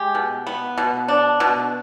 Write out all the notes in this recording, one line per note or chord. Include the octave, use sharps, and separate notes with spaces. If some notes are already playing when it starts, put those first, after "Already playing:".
Already playing: G#3 G4
B2
B3
B2
D4
B2